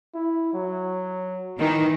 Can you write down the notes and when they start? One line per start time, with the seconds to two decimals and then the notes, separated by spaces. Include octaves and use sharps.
0.14 E4
0.54 F#3
1.58 D#3 E3